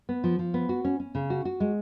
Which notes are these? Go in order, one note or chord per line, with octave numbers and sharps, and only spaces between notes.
B3
F3
F3
B3
F#4
C#4
C#4
C#3
F#4
F#4
G#3